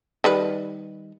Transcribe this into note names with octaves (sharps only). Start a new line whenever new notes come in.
D#3 G3 B4